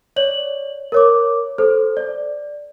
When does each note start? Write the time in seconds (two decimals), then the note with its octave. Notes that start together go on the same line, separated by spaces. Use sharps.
0.16 C#5 D5 F#7
0.92 A#4 C#5 D6
1.58 A4 C5
1.97 D5